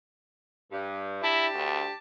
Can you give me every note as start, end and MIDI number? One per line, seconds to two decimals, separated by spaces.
0.72 1.20 43
1.23 1.94 62
1.23 1.47 64
1.23 1.94 67
1.23 1.94 81
1.54 1.85 38